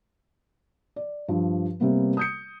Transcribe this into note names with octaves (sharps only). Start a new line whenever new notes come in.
D5
G2 F3
C3 G3 A#3 B3
D#6 G6 C#7